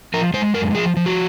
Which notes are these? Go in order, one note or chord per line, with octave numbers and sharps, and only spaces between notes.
F3 A#4
G#3 C5
F#2 A#4
F3 G#4
F3
F#4